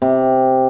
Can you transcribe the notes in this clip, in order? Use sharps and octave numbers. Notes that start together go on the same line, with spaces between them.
C3